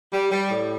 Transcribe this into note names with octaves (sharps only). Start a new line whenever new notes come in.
G3
G3
A2